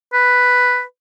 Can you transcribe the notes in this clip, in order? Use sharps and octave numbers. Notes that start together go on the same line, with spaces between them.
B4